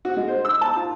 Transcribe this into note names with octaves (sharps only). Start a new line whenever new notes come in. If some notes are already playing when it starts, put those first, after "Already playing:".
F#4
G#3
C5
E6
A5
F4